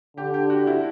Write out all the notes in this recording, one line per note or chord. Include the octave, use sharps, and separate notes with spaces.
D3 G4
G4
F#4
E4